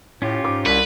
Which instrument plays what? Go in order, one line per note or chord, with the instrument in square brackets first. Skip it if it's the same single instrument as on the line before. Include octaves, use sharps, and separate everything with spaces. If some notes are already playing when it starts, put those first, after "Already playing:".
[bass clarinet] A2 [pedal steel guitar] C#4 F4 G4
[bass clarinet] G#2 [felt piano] D6
[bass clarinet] C2 [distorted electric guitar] B4 [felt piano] B6